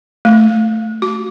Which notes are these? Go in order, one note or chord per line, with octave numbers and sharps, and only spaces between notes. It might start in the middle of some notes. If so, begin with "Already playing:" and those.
A3
F#4